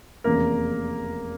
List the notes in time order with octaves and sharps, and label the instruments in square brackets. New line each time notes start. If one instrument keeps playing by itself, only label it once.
[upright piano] F1 E2 C#3 [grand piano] A#3 A#4